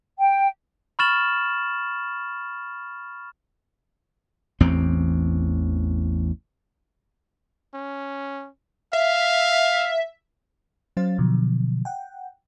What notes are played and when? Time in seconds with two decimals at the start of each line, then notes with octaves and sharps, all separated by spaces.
0.18 G5
0.99 B5 C#6 F6 A6 E7 F#7
4.60 A1 E2 C4
7.74 C#4
8.93 E5 F5
10.97 F#3 C#4 C5 F5 A6
11.18 B2 D3 F3 F#3
11.85 F#5 G5